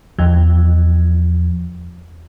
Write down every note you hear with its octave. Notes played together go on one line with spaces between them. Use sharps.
E2 F3